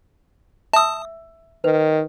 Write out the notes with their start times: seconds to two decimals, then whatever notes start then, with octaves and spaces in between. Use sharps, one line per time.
0.73 E5 A5 D#6 E6
1.64 D#3 B4